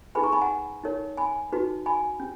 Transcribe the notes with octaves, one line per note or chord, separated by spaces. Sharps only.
D#4 G#4 B4 G#5 B5
A#5 C#6
G#5 B5
F#5 A#5
D#4 A#4 C#5
G#5 B5
D#4 F#4 B4
G#5 B5
C#4